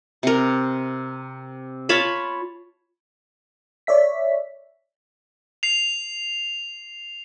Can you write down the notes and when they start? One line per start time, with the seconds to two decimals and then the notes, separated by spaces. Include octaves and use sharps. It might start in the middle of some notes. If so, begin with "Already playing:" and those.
0.23 C3 A#4
1.89 F4 C#5 A5 B5
3.87 C#5 D5 E5 B6
5.63 C7 F7